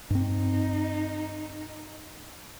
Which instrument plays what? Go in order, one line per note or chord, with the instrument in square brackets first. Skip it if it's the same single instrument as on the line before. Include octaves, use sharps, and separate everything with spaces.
[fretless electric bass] G2 C4 [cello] D#4